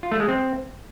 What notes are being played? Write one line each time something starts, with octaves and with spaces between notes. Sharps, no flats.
F4
A3
G#3
C4